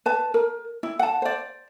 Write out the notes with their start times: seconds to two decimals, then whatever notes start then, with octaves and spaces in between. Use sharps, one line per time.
0.06 B4 A5
0.34 A#4
0.83 E4
0.99 F#5 A5
1.22 C5 D5